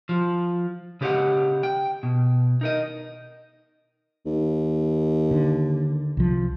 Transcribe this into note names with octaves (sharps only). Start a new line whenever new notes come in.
F3
C#3 G4 A4 B4 D#5 F#5
G5
B2
D#4 A#4 D#5
D#2
D3
C2 F3